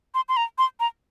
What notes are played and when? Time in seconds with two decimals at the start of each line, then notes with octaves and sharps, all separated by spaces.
0.15 C6
0.29 C6
0.37 A#5
0.58 C6
0.80 A#5